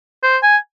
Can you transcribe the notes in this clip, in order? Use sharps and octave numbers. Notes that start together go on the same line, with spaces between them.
C5
G#5